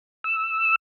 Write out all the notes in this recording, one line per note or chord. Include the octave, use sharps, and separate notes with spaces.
E6